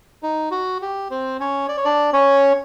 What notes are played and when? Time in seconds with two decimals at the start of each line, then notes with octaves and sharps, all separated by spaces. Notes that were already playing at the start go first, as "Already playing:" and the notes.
0.23 D#4
0.51 F#4
0.82 G4
1.11 C4 C5
1.40 C#4 C#5
1.69 D5
1.77 C#5
1.85 D4 D5
2.13 C#4 C#5